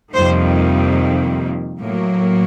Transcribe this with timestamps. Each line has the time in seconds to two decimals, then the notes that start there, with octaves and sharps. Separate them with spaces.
0.14 F2 C3 D#3 G3 A#3 C5
1.81 A2 F#3 A#3